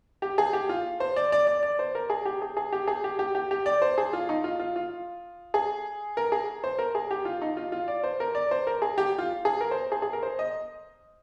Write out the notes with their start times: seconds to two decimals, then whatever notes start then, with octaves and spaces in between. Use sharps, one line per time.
0.22 G4
0.38 G#4
0.53 G4
0.69 F4
1.00 C5
1.16 D5
1.32 D5
1.47 D5
1.63 D5
1.79 C5
1.95 A#4
2.10 G#4
2.25 G4
2.42 G#4
2.57 G#4
2.73 G4
2.88 G#4
3.04 G4
3.19 G4
3.35 G4
3.51 G4
3.66 D5
3.82 C5
3.98 G#4
4.13 F4
4.29 D#4
4.44 F4
4.59 F4
4.76 F4
5.54 G#4
6.17 A#4
6.32 G#4
6.64 C5
6.79 A#4
6.95 G#4
7.11 G4
7.25 F4
7.42 D#4
7.57 F4
7.72 F4
7.88 D5
8.04 C5
8.20 A#4
8.35 D5
8.51 C5
8.67 A#4
8.82 G#4
8.98 G4
9.18 F4
9.45 G#4
9.61 A#4
9.71 C5
9.92 G#4
10.02 G#4
10.13 A#4
10.23 C5
10.39 D#5